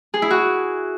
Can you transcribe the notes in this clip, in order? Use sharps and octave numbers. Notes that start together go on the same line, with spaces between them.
G#4
E4
F#4